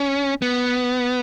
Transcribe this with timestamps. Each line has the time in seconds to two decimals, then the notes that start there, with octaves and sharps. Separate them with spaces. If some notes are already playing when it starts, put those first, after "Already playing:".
Already playing: C#4
0.42 B3